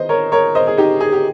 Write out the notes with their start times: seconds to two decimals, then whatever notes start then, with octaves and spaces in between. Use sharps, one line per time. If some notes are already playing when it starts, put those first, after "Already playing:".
Already playing: D#3 C5 D#5
0.09 A#4 C#5
0.32 A#4 C#5
0.55 C5 D#5
0.67 G#4
0.78 D#4 G4
1.00 G#4
1.12 G4